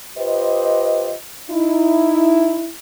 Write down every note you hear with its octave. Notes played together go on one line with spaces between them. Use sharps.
F4 G4 B4 C5 D#5
D#4 E4